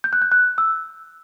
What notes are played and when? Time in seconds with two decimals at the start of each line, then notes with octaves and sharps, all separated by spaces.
0.04 G6
0.13 F#6
0.22 G6
0.32 F#6
0.58 E6